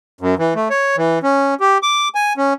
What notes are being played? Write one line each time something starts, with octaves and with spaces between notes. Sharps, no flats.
F#2
E3
A3
C#5
E3
C#4
G4
D6
G#5
C#4